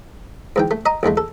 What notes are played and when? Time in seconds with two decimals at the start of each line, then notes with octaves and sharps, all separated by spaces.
0.56 G#2 E3 G5
0.71 A3
0.86 D#5 A#5 D#6
1.03 A#1 E2 G#3 A3
1.17 A4